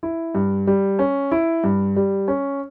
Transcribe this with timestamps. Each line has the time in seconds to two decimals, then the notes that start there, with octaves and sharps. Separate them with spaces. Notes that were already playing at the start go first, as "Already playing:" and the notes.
0.03 E4
0.35 G2
0.67 G3
0.99 C#4
1.32 E4
1.64 G2
1.96 G3
2.28 C#4